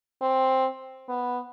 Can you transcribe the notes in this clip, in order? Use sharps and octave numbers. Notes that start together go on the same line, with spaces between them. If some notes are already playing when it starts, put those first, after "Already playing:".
C4
B3